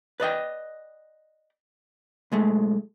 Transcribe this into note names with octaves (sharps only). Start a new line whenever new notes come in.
B4 D5 D#5 G5
B1 G#3 A3